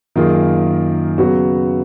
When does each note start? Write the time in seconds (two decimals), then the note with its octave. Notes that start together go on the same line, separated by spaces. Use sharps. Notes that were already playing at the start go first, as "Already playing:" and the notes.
0.16 F#2 D#3 A#3 F4 G#4
1.18 C#3 F#3 B3 F#4